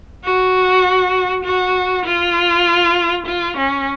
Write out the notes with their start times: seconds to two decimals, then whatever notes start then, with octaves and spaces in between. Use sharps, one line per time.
0.24 F#4
1.45 F#4
2.05 F4
3.26 F4
3.57 C#4